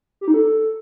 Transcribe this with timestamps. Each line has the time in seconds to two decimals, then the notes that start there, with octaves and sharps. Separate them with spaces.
0.21 G4
0.28 D#4
0.34 A4